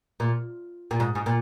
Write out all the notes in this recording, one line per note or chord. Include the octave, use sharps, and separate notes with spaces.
A#2
A#2
G#2
G#2
A#2